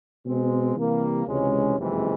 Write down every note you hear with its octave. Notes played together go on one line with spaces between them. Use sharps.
B2 G#3 C4
C3 E3 G3 A#3
C#2 C3 E3 G#3 C#4
F#1 F2 C3 E3 G#3